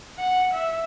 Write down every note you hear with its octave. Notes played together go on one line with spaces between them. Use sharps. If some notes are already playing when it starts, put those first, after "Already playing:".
F#5
E5